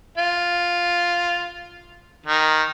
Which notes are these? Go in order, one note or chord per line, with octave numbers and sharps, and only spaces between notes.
F4
D#3